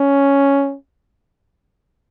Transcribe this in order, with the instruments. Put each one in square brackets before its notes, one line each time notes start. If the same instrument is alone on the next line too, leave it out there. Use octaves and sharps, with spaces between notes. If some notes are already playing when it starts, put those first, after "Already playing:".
Already playing: [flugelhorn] C#4